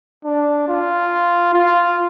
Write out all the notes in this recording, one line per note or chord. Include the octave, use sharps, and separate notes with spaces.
D4
F4
F4